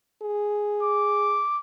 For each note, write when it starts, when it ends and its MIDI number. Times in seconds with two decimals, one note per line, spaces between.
0.22 1.43 68
0.82 1.59 86